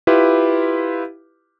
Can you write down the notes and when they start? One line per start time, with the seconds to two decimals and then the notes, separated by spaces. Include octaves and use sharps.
0.07 E4 F4 G4 B4